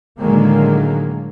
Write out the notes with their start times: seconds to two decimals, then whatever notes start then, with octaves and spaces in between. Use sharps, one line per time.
0.21 A2 D3 D#3 F#3 G#3 A#3